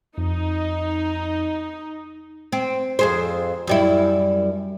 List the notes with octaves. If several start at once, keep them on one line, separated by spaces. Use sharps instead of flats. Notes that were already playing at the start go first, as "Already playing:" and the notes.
F2 D#4
C4
F2 G#4 C5
F#2 G3 E4